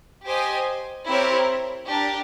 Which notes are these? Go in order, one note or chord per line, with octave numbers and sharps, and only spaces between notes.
G4 C5 D#5 G#5
C4 E4 G4 A#4 C#5
D4 G4 A#4